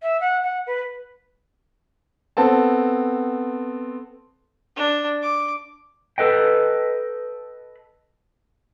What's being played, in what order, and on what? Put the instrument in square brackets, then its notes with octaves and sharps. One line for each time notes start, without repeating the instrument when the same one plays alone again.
[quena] E5
F#5
F#5
B4
[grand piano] B3 C4 A4 A5
[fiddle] D4
D6
[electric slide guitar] A4 B4 D#5 G5